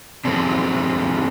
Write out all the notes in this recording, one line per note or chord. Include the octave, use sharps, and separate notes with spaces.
D3 F3 G#3 C4 D4